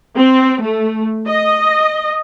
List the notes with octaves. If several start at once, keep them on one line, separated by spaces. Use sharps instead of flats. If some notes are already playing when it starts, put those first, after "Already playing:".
C4
A3
D#5